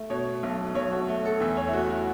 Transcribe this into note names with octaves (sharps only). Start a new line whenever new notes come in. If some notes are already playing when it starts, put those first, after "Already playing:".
Already playing: A3
B2 C#5
B1
B1 C#5
F#4
A3
A4
E2 E5
C#5
E4
A3 F#4
F#4